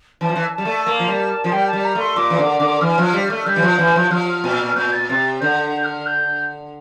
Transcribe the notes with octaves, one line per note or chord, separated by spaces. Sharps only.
E3 A5
F3
E3
G3 A5
A3
A#3
F3
G3
F3
G3 G5
A5
G3
A#5
A3 C6
A#2 D6
E3
D3
D3
E3 F6
F3
G3 F6
A3
G3 G6
E3
F3
E3
F3
F3 F6
A#2
A#2 G6
A6
C3 A6
D3 G6
G6
F6
G6